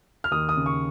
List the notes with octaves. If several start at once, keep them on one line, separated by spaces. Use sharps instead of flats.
F6
D#2 D#6
D#6
C#3
C#6